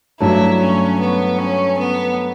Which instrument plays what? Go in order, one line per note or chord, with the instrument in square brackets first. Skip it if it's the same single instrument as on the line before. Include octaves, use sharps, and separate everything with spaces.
[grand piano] G2 F#3 A3 [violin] E4
[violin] C#4
B3
C#4
B3